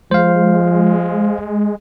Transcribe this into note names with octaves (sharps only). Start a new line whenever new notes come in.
F3 G#3 C5 F5